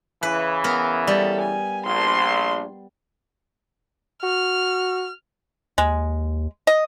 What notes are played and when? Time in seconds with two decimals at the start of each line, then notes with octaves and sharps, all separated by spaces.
0.23 C#3 E3 B4
0.64 B3 A#4
1.07 G3 A4
1.40 G#5
1.86 A#1 C6
4.23 F#4 F6
5.78 D#2 G#3
6.67 D#5